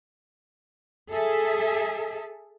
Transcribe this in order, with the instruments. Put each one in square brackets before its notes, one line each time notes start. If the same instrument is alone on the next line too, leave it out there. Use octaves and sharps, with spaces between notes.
[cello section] G#4 A4 E5